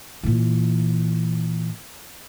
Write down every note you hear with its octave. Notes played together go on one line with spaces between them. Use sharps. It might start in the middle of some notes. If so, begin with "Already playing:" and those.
A#2 E3